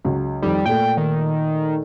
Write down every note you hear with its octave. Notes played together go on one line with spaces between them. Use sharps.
C#2 F#3
F2 D#3 G3
A#2 A3 G5
D#3